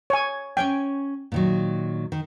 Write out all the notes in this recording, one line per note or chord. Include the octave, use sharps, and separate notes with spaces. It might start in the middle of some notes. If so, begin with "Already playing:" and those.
C#5 G#5
C#4 C#5 G5 G#5
A#2 D#3 F#3
D#3